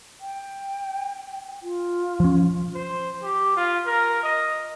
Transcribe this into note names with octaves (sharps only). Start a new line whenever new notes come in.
G5
F4
F3 C#4
C5
G4
F4
A#4
D#5